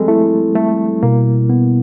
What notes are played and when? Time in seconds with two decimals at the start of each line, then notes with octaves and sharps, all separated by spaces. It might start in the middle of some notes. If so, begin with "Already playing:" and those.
Already playing: F3 G3 G#3 C4 A4
0.08 A3 E4
0.56 G3 A3
1.03 B2 A#3
1.50 B3